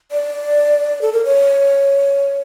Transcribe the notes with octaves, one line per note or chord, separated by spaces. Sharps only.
D5
A4
A#4
C#5